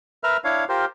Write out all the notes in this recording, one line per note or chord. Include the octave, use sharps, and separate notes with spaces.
A#4 B4 E5 F6
D4 E4 C#5 F5
F4 G4 A#4 C5